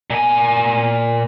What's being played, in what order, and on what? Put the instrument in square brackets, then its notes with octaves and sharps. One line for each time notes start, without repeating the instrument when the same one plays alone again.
[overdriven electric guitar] A#2 G#5